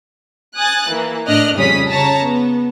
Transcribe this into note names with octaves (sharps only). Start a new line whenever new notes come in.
G#5 D#6 F#6 A6
E3 A#3
A2 D4 D#5 F6 F#6
F2 C#3 G3 C#4 D#6 B6
C#3 C#5 A5 A#5
B3